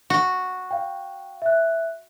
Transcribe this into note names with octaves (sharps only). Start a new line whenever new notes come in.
F#4
F5 G5
E5 F#6